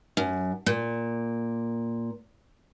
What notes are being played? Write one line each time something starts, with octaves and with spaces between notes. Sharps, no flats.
F#2
A#2